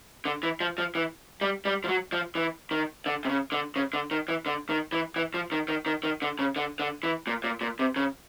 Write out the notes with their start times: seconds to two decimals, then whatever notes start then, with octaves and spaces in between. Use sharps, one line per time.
0.25 D3
0.43 E3
0.60 F3
0.78 F3
0.95 E3
1.41 G3
1.65 G3
1.84 F3
1.88 F#3
2.12 F3
2.35 E3
2.71 D#3
3.06 D3
3.25 C3
3.29 C#3
3.52 D3
3.76 C#3
3.93 D3
4.11 D#3
4.28 E3
4.46 D3
4.70 D#3
4.92 E3
5.16 E3
5.34 F3
5.52 D#3
5.68 D#3
5.86 D#3
6.03 D#3
6.22 D3
6.39 C#3
6.56 D3
6.79 D3
7.03 E3
7.27 A#2
7.44 A#2
7.61 A#2
7.79 C3
7.96 C#3